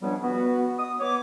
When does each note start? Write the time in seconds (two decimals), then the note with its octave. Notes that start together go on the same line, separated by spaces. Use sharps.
0.01 C#2 F3 G3 B3 D4 C#5
0.22 B3 F#4
0.78 D#6
0.99 B3 C#5 D6